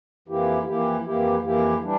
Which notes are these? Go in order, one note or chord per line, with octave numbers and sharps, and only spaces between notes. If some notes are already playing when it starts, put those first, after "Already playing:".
F2 E3 A#3 E4 G4
F2 E3 A#3 E4 G4
F2 E3 A#3 E4 G4
F2 E3 A#3 E4 G4
E3 G3 D4